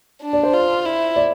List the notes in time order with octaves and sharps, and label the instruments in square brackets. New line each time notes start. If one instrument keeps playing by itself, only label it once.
[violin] D4
[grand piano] D5
C5
[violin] F4
E4
[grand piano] D5